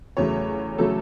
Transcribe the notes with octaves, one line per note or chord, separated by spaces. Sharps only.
E2 C#3 F#3 A3 C#5
C#3 F#3 A3 A4